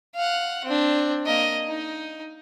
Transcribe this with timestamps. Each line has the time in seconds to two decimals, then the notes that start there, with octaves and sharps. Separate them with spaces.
0.15 F5 F#5
0.65 C4 D4
1.26 A#3 D#5
1.68 D#4